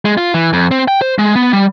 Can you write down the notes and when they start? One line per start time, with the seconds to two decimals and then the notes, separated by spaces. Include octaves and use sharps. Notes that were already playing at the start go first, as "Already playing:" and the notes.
0.05 G#3
0.18 F4
0.34 E3
0.53 F2
0.71 C4
0.88 G5
1.02 C5
1.19 G#3
1.36 B3
1.53 G3